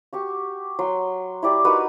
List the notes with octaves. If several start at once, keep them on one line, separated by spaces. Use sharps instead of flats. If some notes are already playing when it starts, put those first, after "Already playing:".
F#4 G4 C#6
F#3 C6
E4 G4 D5
D#4 F#4 A#4 B4